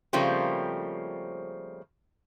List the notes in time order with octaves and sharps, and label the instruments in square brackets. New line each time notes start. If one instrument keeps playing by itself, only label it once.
[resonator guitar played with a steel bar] C#3 F3 G3 A3 A#3 C4